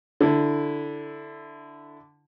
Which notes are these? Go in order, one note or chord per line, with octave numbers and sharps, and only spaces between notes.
D3 E4